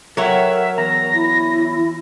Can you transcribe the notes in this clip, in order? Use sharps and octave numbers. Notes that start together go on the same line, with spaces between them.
F#3 A4 A#4 C#5 E5 F#5 G5
E2 A#5 A#6
E4